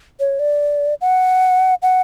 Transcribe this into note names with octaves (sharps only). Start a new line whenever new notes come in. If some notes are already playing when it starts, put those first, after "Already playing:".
C#5
D5
F#5
F#5